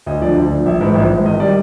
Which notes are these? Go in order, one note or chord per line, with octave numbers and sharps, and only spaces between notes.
D2 D#5
D3 F3 D5
D2
D3 F3
A#1 E5
G#2 E3
A#1
G#2 E3
G#1 D#5
D#3 G3 D5